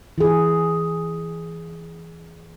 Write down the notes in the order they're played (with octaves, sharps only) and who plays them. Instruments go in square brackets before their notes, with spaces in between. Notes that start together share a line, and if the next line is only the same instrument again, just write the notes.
[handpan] E3 G#4